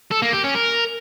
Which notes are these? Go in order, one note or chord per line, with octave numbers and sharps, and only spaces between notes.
A4
A#3
G4
C#4
A#4